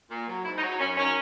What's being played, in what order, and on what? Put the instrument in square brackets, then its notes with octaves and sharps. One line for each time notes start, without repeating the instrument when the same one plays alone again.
[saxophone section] A#2
F#3
G#2 E4
D#4
F#3
D#4
F#2 C#4
D#3 F#3 C#4